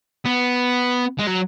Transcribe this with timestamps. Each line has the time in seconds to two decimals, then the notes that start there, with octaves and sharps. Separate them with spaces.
0.25 B3
1.19 G#3
1.27 F#3